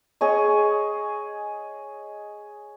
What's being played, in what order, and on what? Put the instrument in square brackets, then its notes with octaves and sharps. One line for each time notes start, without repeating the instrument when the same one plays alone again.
[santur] G#4 C#5 D#5